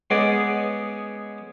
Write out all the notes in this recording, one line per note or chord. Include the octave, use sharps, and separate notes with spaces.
G#3 B3 C#4 G#4 D5 D#5